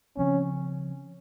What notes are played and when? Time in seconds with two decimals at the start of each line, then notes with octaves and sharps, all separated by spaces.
0.17 C#3 F3 C4 C#4